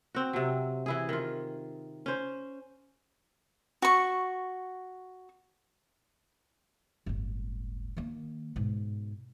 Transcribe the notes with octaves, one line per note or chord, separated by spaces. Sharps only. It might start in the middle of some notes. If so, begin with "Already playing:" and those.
C4 F#4
C3 F#3
E3 E4 G#4
D#3 F4
C#4 C5
F#4 C#6
D1 G1
D#3 A#3
G#2 B2